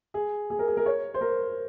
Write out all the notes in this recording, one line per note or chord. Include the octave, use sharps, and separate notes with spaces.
G#4
G#4
A#4
G#4
A#4
C#5
C5
A#4